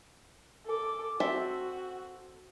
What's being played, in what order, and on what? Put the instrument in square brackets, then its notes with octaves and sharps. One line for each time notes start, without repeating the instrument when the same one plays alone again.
[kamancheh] A4 D6
[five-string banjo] C4 A4 E5 [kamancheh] F#4